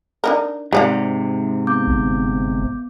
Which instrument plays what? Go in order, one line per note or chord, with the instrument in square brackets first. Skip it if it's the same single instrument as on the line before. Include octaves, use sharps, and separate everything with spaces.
[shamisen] D4 D#4 A#4
[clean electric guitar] G#2 C3 [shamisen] G4 D5 F#5
[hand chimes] B3 D6 G6
[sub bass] G1